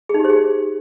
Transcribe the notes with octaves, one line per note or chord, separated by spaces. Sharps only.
G#4
D#4
G4
C5
G#4